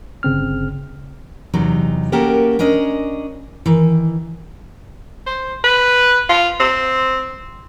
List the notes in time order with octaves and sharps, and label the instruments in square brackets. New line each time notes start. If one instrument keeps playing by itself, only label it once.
[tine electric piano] G1 C#3 C4 F6
[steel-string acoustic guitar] E2 C3 F#3 D#4
A#3 C#4 F#4 G4 A4 A#4
C#4 D4 A#4 D#5
D#3 E3
[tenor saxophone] C5
B4
F4
C4